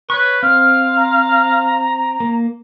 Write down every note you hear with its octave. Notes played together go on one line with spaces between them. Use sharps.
B4 C#5 C#6
C4 F5 F6
A#5
A#3